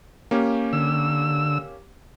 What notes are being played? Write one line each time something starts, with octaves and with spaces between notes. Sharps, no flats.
A#3 C#4 G4
D3 E6